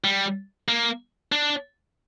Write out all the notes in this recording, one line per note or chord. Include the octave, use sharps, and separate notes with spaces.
G3
A#3
D4